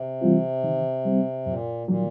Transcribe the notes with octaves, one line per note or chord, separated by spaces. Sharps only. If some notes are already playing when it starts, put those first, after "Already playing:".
Already playing: C3
E3 G3 C4 F4
D#3
G3 C4
F#2 A#2
A#2 D#3 F#3 A#3